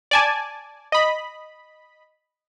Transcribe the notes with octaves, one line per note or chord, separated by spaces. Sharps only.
D5 G#5 A5
D#5 B5